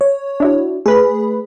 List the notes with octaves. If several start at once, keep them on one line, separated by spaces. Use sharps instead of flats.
C#5
D4 E4 F#4
A3 G#4 B4 B5